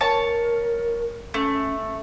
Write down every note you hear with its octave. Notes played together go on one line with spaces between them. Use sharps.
A#4 C#5 A5
A3 C#4